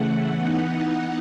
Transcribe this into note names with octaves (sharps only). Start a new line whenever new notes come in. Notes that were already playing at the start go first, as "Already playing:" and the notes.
Already playing: C#3 E3 A3 F#5
E3 B3 D#4